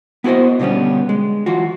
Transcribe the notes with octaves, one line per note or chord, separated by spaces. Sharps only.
B3 E4 F#4 G#4 C5 D#5
B2 D3 G3 B3 C#4
G#3
E3 F4 F#4